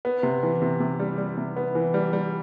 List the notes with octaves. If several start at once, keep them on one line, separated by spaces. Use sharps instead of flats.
B3
C3
E3
C3
C3
G3
G3
C3
B3
E3
G3
G3